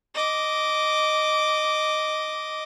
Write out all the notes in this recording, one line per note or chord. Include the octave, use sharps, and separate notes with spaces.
D#5 D6